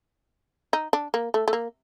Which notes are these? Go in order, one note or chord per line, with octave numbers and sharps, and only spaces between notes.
D#4
D4
A#3
A3
A3
A#3